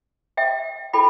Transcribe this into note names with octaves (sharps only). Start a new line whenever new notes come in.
E5 G5
F4 A4 G5 B5